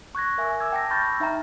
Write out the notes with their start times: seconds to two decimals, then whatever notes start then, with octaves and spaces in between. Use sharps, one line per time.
0.15 C#6 F#6 G#6 A#6
0.38 A#4 E5 G#5
0.60 D6 E6 G#6
0.72 G5 A5 D6 E6 A#6
0.90 B5 C#6 F6 G6 A6 A#6
1.20 D#4 E5 G5 A#5